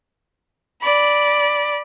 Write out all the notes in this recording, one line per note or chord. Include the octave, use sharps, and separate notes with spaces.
D5 B5